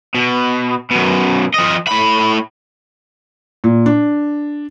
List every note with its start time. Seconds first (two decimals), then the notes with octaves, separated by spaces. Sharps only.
0.15 B2
0.91 F#2 B2
1.54 F3 D#5
1.87 A2 B5
3.64 A#2
3.86 D4